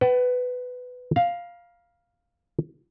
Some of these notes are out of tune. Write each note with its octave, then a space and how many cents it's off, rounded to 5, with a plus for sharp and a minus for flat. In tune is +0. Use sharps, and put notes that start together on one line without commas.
B4 +15 F#5 +45 A5 +0
F5 +0 A#5 +45